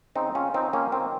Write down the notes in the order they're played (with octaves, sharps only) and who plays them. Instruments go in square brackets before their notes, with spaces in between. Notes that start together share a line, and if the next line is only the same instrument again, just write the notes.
[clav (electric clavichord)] C#3 C4 D#4
C#3 C#4 F4
F3 C4 D#4
F3 A#3 C#4
D#3 C4